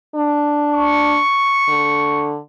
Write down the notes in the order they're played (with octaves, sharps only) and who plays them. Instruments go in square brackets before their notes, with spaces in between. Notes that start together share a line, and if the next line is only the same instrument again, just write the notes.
[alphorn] D4
[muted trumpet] C#6
[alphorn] D3